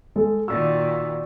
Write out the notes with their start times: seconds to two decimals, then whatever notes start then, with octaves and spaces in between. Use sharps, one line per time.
0.16 G#3 A4
0.48 A#2 D#3 F#4 D5 E6